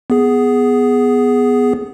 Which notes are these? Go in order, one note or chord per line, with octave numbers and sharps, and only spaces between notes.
B3 G#4